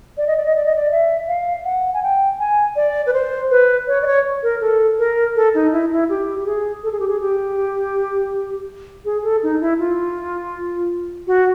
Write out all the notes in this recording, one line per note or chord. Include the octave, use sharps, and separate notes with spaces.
D5
D#5
D5
D#5
D5
D#5
D5
E5
F5
F#5
G#5
G5
G#5
D5
B4
C5
B4
C#5
D5
C#5
A#4
A4
A#4
A4
D#4
E4
E4
G4
G4
G#4
A4
G#4
G4
G#4
G4
G#4
A4
D#4
E4
F4
F#4